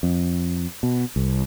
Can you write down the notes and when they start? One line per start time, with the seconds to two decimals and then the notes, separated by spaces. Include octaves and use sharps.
0.03 F2
0.83 B2
1.16 C2